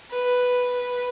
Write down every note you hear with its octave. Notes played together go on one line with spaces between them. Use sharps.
B4